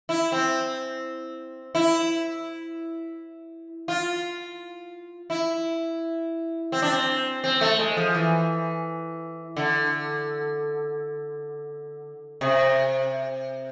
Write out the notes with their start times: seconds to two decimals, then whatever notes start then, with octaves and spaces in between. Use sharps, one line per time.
0.09 E4
0.32 C4
1.75 E4
3.88 F4
5.30 E4
6.72 C4
6.82 D4
6.92 C4
7.44 C4
7.61 A3
7.79 G#3
7.97 F3
8.15 E3
9.57 D3
12.41 C3